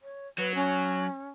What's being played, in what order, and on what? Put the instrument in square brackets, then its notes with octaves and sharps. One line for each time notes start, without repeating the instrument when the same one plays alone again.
[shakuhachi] C#5
[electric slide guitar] F#3 [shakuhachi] B4
[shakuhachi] C#4